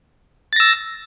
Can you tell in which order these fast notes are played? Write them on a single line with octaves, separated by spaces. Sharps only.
A6 A#6 E6